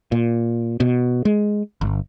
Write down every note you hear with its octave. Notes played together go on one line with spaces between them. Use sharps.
A#2
B2
G#3
G1